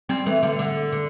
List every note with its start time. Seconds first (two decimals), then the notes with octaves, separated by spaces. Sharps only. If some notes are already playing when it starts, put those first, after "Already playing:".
0.09 G3 C4
0.26 E3 A3
0.43 D3 G3
0.59 D3
0.92 D3